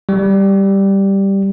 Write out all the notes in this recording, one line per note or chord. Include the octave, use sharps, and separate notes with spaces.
G3